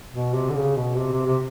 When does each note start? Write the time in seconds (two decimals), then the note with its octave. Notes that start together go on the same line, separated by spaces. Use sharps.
0.13 B2
0.34 C3
0.49 D3
0.55 C#3
0.77 B2
0.98 C3
1.12 C3
1.26 C3